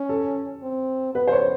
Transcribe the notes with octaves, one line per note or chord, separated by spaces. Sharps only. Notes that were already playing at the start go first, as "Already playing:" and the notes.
Already playing: C#4
A4
C4
B3 B4
C5
C#5